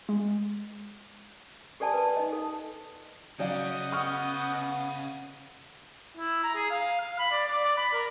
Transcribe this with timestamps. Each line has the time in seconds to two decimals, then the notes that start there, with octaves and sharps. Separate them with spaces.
0.09 G#3
1.80 G4 A4 D5 G#5 A5
1.94 B4 A5
2.17 D#4 D#5
2.32 A4
3.39 C#3 F#3 D5 D#5 F5 F#5 G6
3.92 B3 C#6 D#6 F6
6.17 E4
6.44 A#5
6.55 G#4
6.71 F5
7.00 F5
7.19 B5
7.32 D5
7.48 D5
7.64 D5
7.77 B5
7.93 A#4